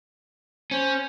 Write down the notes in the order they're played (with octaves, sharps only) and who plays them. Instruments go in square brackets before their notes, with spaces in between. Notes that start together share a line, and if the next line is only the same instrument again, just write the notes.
[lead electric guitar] C#4 [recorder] C5